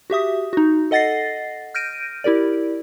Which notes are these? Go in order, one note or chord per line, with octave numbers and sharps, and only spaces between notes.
F#4 G4 E5 D#6
D#4 F#4
A4 D#5 F#5 A6 A#6 C7
F6 G6 A#6 D7 D#7
E4 G4 A#4 D5